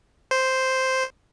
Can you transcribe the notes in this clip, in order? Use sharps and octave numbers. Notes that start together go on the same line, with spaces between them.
C5